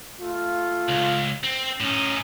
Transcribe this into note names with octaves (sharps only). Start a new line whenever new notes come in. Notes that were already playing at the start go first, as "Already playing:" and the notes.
A3 F4
C#2
C4
A2 C#4 D#4